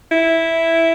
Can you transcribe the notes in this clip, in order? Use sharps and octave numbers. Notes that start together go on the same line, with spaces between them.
E4